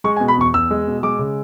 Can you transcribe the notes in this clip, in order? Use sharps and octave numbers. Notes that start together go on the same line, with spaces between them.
G#3 C#6
G#5
B2
B5
E2 C#6
E2 E6
G#3
B2
G#3 D6
C#3